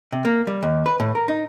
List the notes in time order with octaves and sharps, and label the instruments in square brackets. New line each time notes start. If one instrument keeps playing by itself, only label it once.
[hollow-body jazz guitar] C3
A#3
G3
D#2
B4
A2
A#4
D#4